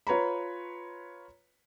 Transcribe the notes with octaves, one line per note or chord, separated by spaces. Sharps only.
F4 B4 C#5 A#5 B5